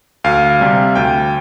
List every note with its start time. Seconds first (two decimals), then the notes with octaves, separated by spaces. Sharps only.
0.24 D2 F5
0.60 C3 G3
0.95 D2 G5